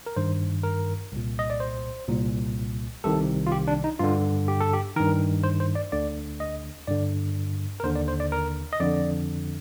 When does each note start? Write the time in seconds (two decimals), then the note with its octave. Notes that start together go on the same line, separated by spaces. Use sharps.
0.06 A#4
0.17 G2 D#3 C5
0.63 A#4
1.12 C2 A#2
1.39 D#5
1.50 D5
1.60 C5
2.08 C2 A#2
3.04 C2 C3 D#3 A4
3.47 F4
3.52 G4
3.68 D4
3.84 D#4
4.00 G2 D3 F4
4.48 G4
4.61 A4
4.73 G4
4.96 G2 D#3 A#4
5.44 C5
5.60 C5
5.75 D5
5.92 D2 D3 D5
6.40 D#5
6.87 G2 D3 D5
7.80 A#4
7.83 D#2 D3 C5
7.95 D5
8.08 C5
8.20 D5
8.32 A#4
8.73 D#5
8.80 F2 D3 D5